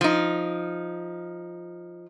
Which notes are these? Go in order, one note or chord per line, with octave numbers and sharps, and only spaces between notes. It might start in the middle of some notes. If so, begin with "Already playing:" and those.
F3 D#4